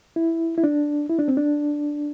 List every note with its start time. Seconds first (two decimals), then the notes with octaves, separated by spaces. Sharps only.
0.16 E4
0.58 E4
0.64 D4
1.09 E4
1.19 D4
1.28 C4
1.37 D4